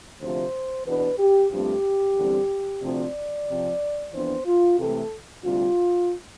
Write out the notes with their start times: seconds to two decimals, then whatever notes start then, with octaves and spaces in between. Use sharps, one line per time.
0.20 D2 C3 F3 C5
0.86 E2 B2 B3 D4 B4
1.19 G4
1.51 G2 F3 A3 C4 G4
2.17 E2 D3 G3 C4
2.82 D2 C3 F3 C4 D5
3.48 C3 F3 C4
4.13 F2 E3 B3 D4 C5
4.46 F4
4.78 C3 E3 A3 A4
5.43 D2 C3 G3 F4